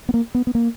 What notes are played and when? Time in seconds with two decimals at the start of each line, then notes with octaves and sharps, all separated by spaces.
0.09 B3
0.14 A#3
0.35 B3
0.47 B3
0.55 A#3